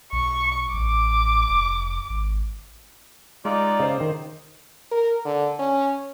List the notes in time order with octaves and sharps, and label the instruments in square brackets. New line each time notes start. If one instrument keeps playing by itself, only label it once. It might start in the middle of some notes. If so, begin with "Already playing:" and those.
[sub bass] B1 [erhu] C#6
[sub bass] A1 [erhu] D6
[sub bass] F1
G#1
[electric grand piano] G#3 [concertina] D#4 F4 [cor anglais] D5
[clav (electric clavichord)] C#3 [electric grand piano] C5 D#5
[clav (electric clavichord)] D#3
[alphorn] A#4
D3
C#4